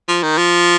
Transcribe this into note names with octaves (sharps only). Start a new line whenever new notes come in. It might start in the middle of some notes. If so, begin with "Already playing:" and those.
F3
D#3
F3